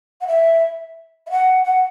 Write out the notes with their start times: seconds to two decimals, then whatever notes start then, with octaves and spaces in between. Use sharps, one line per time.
0.21 F#5
0.27 E5
1.27 E5
1.30 F#5
1.65 F#5